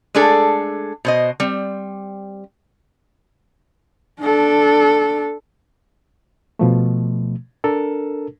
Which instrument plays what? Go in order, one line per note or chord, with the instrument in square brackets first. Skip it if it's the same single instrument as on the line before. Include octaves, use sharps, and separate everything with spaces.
[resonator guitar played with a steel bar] G#3 A3 D4 G#4 A4
B2 C5 D#5
G3 C4
[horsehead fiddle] D4 A4
[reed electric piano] B2 F3 A3
D4 A4 A#4